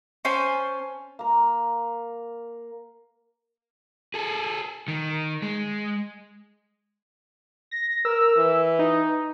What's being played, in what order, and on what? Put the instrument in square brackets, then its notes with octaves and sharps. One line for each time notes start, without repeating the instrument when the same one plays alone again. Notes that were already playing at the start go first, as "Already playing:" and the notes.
[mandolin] C#4 C5 G#5 A5
[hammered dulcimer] A#3 A#4
[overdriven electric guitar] G#4 A4
D#3
G#3
[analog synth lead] A#6
[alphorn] A#4 [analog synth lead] E6
[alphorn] E3
[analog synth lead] D#4